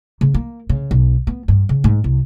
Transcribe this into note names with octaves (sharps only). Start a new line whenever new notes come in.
C#3
A#3
C#3
B1
B3
G2
C#3
G#2
C2